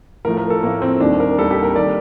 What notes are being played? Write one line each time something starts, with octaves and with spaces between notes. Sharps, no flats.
A2 F3 A3 A#4
A#4
A4
A2 F3 A3 A#3
C4
D#2 D#3 G3 D4
A#4
D#2 D#3 G3 A4
G4
A#4
D#3 G3 D5